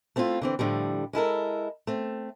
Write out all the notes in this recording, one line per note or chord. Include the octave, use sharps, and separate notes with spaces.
A3 B3 C4 E4 F4
D3 E3 C4
A2 D3 F3 G3
G#3 E4 A4 A#4
A3 C4